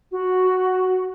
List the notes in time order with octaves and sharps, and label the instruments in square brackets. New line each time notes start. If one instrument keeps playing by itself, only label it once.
[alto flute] F#4